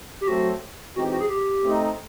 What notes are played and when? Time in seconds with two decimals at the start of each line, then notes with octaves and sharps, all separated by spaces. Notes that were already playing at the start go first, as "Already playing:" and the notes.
0.21 G4
0.28 F#3 A3 C4 F#4
0.95 E3 G#3 C4 D#4 F#4 G4
1.12 F#4
1.20 G#4
1.29 G4
1.63 A3 C4 D#4